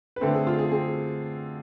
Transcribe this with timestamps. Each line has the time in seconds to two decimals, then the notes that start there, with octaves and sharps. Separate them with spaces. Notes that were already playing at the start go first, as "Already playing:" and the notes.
0.16 B4
0.21 D3 A3 C4 A4
0.34 G#4
0.47 F4
0.59 G#4
0.71 C4 G#4